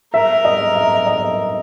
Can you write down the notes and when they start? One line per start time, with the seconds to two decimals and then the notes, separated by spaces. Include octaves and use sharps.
0.14 A#4 E5
0.45 D#5
0.76 E5
1.07 D#5